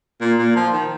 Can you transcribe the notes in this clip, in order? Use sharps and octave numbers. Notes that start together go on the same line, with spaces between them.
A#2
A#2
F3
D#3